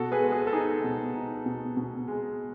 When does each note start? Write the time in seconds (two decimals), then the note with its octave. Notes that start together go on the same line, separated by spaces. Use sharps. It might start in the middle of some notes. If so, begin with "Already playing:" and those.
Already playing: B2 F#4 A4
0.12 G#4 B4
0.22 G#3
0.32 G#4
0.47 A4
0.53 D#4 G#4
0.84 B2
1.15 D#4
1.46 B2
1.77 B2
2.08 G#3